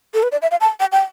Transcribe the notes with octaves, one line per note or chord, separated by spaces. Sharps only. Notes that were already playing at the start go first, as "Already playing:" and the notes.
A4
B4
D5
E5
F5
A5
G5
G5